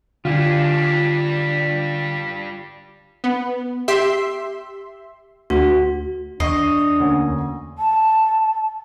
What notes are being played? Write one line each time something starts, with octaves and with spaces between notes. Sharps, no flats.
D3 G3 D4 F4 G4 G#5
B3
G4 E5 C6
D2 F#4
E2 D4 D#5 C#6 C7
D2 A#3 C#4
A5